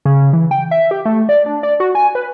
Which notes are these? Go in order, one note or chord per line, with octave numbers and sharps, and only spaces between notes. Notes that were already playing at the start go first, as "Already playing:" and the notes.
C#3
E3
G5
E5
G4
A3
D5
D4
D5
F#4
G#5
B4